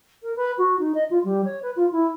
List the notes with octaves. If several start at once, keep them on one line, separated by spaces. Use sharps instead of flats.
A#4
B4
F#4
D#4
D#5
F4
G3
C#5
B4
F4
E4